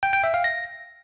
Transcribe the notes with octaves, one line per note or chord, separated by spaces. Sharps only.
G5
G5
E5
F5
A#6